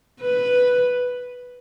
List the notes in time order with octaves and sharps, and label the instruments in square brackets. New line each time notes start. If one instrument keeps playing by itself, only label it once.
[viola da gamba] B4